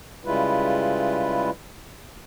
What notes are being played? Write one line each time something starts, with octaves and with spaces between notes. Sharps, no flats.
C#3 G3 G#3 E4 F4 B4